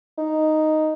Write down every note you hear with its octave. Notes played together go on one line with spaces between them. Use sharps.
D#4